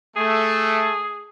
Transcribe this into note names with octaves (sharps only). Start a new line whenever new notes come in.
A3 G#4